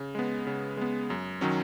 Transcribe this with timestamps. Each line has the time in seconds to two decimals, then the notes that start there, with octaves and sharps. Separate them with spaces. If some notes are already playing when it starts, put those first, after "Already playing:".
Already playing: C#3
0.15 G#3 B3
0.47 C#3
0.77 G#3 B3
1.10 F#2
1.41 D#3 F#3 C#4